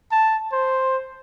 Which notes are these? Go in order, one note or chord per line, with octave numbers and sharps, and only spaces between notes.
A5
C5